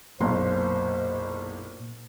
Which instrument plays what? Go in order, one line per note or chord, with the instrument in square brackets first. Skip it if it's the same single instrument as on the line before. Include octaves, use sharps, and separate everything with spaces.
[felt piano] F#1 B1 C6 [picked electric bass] A#2 [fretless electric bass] A#3 [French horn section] C5